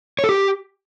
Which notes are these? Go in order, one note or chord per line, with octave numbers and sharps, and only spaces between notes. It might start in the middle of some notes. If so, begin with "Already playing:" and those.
C#5
A4
G4